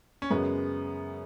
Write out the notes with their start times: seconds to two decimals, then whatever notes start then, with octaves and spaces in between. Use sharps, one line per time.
0.22 C#4
0.30 F#2 C#3 G#3 B3